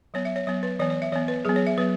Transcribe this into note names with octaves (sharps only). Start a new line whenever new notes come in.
F#3 B3 C#5
E5
C#5
F#3 B3 C#5
B4
E3 B3 C#5
C#5
E5
E3 B3 C#5
B4
F#3 B3 G#4
C#5
E5
F#3 B3 B4